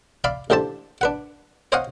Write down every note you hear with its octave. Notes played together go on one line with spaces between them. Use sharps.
D5 E5 F5 B5
A1 D3 G4 C5 E5 A5
D4 B4 F#5
C5 C#5 D#5 F5 F#5 G#5